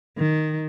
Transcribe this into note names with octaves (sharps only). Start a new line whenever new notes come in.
D#3